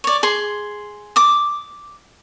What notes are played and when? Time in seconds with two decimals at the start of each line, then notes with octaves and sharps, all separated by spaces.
0.04 C#5 D5
0.23 G#4 C6
1.16 D6 D#6